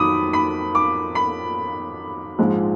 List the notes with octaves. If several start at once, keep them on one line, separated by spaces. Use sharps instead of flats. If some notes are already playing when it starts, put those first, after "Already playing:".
Already playing: F2 D#3 F#3 B5 D6 D#6
B5
D6
B5
A#1 G#2 F3 G#3